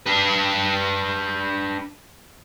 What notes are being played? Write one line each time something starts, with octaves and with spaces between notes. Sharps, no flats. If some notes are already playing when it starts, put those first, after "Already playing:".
D4 B4